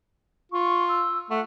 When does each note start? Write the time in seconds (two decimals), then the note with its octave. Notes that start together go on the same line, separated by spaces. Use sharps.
0.52 F4 C#6
0.89 E6
1.30 A3 F#5